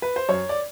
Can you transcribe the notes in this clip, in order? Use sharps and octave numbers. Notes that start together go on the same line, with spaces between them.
B4
C5
F#2 C#5
D5